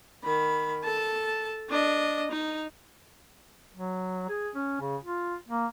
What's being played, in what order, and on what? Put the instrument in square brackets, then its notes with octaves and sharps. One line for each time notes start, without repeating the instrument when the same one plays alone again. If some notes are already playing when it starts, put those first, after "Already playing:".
[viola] D#3 B5
A4 A5
D4 D#5
D#4
[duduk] F#3
G#4
C#4
C#3
F4
A#3